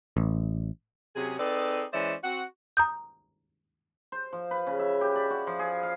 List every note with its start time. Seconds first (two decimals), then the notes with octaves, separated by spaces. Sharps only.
0.17 A1
1.16 C3 F#3 C#4 G#4
1.39 C4 D#4 G#4 A4 B4 D5
1.93 E3 G#3 C#4 C5 D5 E5
2.24 C4 F#4 F#5
2.77 A#5 D#6 G6
4.12 C5
4.33 F3
4.51 B4
4.67 C#3
4.79 E5
5.01 G4
5.16 D5
5.30 F#4
5.47 F3
5.59 G#4
5.83 F5